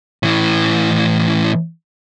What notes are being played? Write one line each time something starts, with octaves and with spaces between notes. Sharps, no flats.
A2 E3